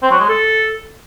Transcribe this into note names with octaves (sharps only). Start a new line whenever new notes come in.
C4
F#3
G#3
A4